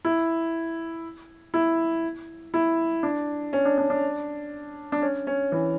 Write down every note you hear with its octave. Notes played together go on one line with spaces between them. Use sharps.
E4
E4
E4
D4
C#4
D4
D4
D4
D4
C#4
C#4
E3